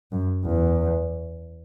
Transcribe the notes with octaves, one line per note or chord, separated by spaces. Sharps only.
F#2
E2